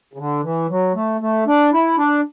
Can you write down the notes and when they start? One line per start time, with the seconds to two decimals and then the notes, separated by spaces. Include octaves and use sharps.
0.13 C#3
0.18 D3
0.43 E3
0.69 F#3
0.95 A3
1.21 A3
1.47 D4
1.73 E4
1.98 D4